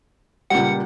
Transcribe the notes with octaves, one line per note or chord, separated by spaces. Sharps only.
C#2 A#2 G3 F#5